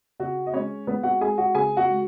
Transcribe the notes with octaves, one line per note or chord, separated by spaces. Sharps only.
C#3 F#4 F#5
D#5
G#3 C#4 C#5
G#3 B3 B4
F#4 F#5
G#3 G#4 G#5
F#4 F#5
C#3 G#4 G#5
F#4 F#5
G#3